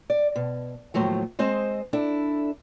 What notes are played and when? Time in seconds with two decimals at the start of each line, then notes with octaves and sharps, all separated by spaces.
0.10 D5
0.36 B2
0.94 D#2 A2 F3 F#3 A3
1.39 G#3 C4 C5 D#5
1.93 D4 E4 A4